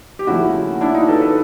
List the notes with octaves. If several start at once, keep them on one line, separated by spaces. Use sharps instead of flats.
G4
D#2 C#3 F3 A3 E4 F#4
D4 E4
D#4 F4
A4 B4
A4 B4